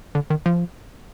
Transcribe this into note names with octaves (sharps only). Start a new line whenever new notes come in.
D3
D#3
F3